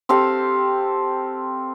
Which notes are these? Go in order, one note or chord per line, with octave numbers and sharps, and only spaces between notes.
C4 G4 A4 F5